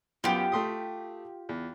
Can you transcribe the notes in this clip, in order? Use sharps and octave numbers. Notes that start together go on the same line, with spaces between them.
F#2 B3 F4 G4
A3 C6 D#6
E2